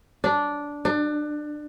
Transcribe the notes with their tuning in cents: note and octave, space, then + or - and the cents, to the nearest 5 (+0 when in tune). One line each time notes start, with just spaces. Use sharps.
D4 -10
D4 +25